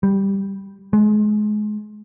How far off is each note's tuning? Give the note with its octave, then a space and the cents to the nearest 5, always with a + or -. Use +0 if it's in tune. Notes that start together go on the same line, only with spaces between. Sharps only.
G3 +0
G#3 +25